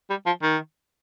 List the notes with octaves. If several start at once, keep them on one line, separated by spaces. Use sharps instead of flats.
G3
F3
D#3